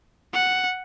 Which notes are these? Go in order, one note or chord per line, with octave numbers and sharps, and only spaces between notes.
F#5